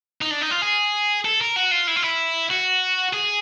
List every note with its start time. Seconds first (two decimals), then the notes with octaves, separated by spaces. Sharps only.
0.22 D#4
0.31 D4
0.42 D#4
0.51 F4
0.62 G#4
1.25 A4
1.41 A#4
1.56 F#4
1.71 F4
1.88 E4
1.96 F4
2.04 E4
2.50 F#4
3.13 G#4